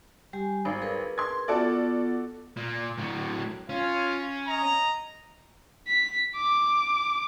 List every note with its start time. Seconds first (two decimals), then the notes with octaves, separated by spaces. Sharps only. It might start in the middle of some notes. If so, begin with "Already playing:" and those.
0.33 G3 G4 G#5
0.65 G#1 C5
0.82 G#4 A#4 B4
1.18 C6 G#6
1.48 B3 F4 F#4 A4 D5
2.56 A#2
2.97 A2 F#3
3.69 C#4 F4
4.48 D#5 A#5
5.88 B6
6.37 D6